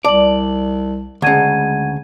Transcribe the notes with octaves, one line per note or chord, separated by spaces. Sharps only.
C2 D5 A5 F#7
D2 C#3 G#3 F#5 G#6 D#7